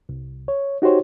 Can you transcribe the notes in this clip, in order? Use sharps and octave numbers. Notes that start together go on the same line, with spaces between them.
C2
C#5
D#4 F#4 G4 C5 C#5